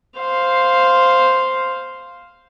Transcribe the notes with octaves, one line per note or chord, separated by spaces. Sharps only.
C5 F5